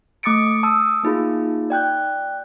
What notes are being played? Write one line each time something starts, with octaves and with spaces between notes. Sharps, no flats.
A3 D6 D#6 A6 C#7 D7
A5 D#6 E6
A#3 D#4 F4 G#4
D5 G5 F#6 G6